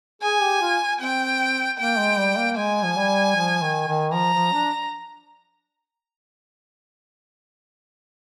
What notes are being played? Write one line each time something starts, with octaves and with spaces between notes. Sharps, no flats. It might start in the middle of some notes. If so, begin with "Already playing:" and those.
G#4 G#5
G4
F4
C4 G5
A#3 G5
G#3
G3
A#3
G#3 G#5
F3
G3
F3
D#3
D#3
F3 A#5
F3
D4